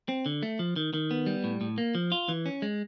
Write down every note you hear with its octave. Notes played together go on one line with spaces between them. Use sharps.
C4
D3
A3
F3
D#3
D#3
B3
G3
A2
A2
A#3
F3
F4
E3
C#4
G#3